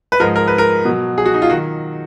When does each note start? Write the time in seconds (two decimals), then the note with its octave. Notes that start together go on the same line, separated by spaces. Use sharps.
0.12 B4
0.20 G#2 F3 G#3 A#4
0.36 A#4
0.48 B4
0.58 A#4
0.85 B2 F#3
1.18 G#4
1.26 F#4
1.34 D#4
1.42 F4
1.50 D#3 F#3 F#4